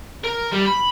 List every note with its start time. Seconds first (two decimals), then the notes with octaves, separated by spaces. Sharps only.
0.24 A#4
0.52 G3
0.66 B5